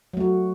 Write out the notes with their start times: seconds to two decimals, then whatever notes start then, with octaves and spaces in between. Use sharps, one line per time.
0.13 F#3
0.17 A3
0.20 F#4